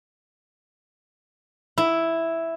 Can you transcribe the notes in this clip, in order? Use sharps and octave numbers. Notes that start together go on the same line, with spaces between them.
E4